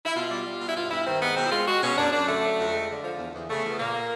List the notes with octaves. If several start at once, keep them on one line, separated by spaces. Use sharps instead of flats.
E4
B2 F4
G3
G3
B2
E4
G2 F4
G2 E4
D#3 C4
G#3 B3
B2 C4
E4
G#3 F4
G#3 F#4
B2 C#4
F#2 D4
F#2 D4
D3 A3
F#3
F2
G#3
D3
F3
E2
E2
C#3 A3
F3
B3
A#2 A#3
A#2